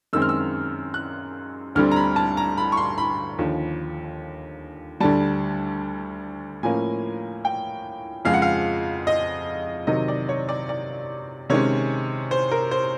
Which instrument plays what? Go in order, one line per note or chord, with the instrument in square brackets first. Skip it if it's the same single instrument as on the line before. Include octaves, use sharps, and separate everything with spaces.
[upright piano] F#2 D#3 G#3 C4 E6
F6
E6
F#6
D2 D3 G3 C4 F6
A#5
B5
A5
A#5
B5
C#6
C6
B5
D#2 D3 F3
D2 D3 G3 A5
A2 F3 A#3 C#4 G#5
G5
F2 C#3 F3 G#3 F5
F#5
F5
D#5
C3 D#3 F#3 D#5
D5
C#5
D5
D5
C3 D#3 G#3 C#4 C#5
C5
A#4
C5